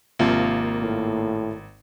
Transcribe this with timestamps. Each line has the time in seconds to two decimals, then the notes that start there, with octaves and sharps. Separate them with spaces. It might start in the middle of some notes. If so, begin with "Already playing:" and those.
0.19 G#1 C3 F3 A#3
0.82 A2